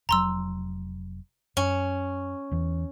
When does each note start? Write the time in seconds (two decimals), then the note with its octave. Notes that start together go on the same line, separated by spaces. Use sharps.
0.09 F1 F#3 A#5 C6 E6
1.57 F#2 C#4
2.51 E2 E3